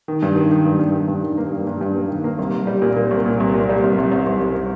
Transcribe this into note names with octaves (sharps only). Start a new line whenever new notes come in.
D#3
G2
D#3
D#3
G2
G2
D#3
G2
D#3
A#3
G2
G2
G2
A#3
D#3
A#3
C2
C2
G3
A#2
A#2
C2
A#2
C2
A#2
G3
C2
C2
C2
C2
C2